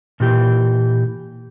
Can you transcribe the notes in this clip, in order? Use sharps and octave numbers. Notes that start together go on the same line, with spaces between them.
A#2 E3 G4